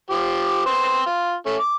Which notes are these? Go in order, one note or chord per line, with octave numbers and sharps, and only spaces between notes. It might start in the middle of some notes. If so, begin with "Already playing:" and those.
F3 G4
B3 C4 C5
F4
A3 C#4
D6